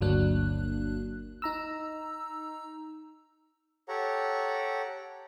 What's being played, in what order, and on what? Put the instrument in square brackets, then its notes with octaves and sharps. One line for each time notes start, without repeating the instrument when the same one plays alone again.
[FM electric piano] G1 D2 F#3 A#3 D4 F#6
D#4 A#5 E6
[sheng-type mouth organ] G4 A4 C#5 F#5 A#5